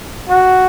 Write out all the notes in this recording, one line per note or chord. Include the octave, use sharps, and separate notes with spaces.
F#4